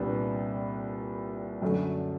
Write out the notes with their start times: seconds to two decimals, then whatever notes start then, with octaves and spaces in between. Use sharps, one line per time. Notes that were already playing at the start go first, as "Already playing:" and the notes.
Already playing: C2 A#2 G3 B3 D4
1.62 F#2 D3 F#3 A3